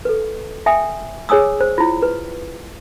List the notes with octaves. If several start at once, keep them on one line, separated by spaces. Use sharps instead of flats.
A4 B4
E5 G5 G#5 D#6
G#4 C#5 G#5 D#6 E6
C5
E4 F4
B4